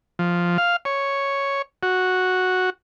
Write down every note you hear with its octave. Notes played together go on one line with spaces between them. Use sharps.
F3
F5
C#5
F#4